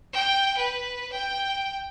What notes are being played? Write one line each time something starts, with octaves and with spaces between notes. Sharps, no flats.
G5
B4
G5